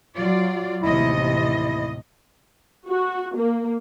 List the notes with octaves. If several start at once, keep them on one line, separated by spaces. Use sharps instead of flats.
F#3 F4 D5
A1 D#2 C3 E4 D#5
E4
F#4
A#3